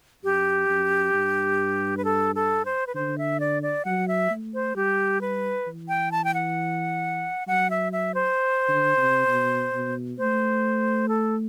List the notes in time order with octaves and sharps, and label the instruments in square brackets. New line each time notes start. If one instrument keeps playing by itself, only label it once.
[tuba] F#2 [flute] G4
[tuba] F#2
G2
[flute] B4
A4
A4
C5
B4
[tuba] D3 [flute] C5
[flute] E5
D5
D5
[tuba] F#3 [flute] F#5
[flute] E5
[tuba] A3
[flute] C5
[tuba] G3 [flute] G4
[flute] B4
[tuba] E3
[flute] G5
A5
G5
F#5
[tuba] F#3 [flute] F#5
[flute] E5
E5
C5
[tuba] D3
C3
B2
B2
[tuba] A3 [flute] C5
[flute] A4